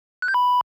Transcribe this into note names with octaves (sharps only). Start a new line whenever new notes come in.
F#6
G6
B5